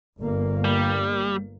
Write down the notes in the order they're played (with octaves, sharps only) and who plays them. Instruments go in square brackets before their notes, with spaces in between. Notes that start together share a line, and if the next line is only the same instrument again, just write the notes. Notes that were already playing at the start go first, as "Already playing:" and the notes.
[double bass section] G1 A#3
[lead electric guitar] G3